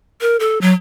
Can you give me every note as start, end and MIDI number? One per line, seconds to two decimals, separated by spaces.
0.21 0.36 70
0.40 0.60 69
0.61 0.73 54